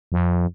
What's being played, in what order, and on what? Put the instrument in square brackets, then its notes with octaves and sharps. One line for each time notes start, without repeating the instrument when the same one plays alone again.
[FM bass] F2